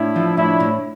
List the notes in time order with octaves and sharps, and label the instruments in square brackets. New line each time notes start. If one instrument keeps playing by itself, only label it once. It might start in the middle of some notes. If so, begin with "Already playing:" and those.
Already playing: [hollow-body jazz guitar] A2 [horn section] D4 E4
[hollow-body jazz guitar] F3
[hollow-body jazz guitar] A2 [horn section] D4 E4
[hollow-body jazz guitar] A2